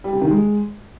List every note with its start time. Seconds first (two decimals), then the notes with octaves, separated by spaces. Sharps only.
0.04 G3
0.13 C3
0.21 D#3
0.30 G#3